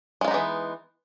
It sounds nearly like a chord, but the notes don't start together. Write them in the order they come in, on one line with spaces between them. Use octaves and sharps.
G#3 F4 D#4 B3 E3